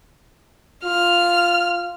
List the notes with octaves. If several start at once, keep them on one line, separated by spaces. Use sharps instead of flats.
F4 F6